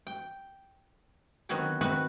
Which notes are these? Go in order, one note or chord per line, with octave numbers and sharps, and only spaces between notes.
G5
D3 D#3 F#3 B3 C4 F#4
D#3 A3 B3 C4 F#4 B4